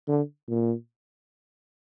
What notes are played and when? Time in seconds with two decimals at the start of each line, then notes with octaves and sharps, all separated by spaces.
0.08 D3
0.48 A#2